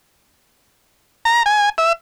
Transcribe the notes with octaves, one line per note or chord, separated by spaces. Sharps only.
A#5
G#5
E5